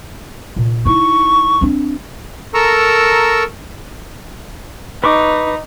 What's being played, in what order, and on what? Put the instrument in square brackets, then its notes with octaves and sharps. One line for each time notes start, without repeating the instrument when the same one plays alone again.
[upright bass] A#2
[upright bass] D#4 E4 [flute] C#6
[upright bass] C4 D4
[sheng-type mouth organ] A4 A#4 A#5 C#6 E6
[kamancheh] D#4 [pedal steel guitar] B4 C#6 D6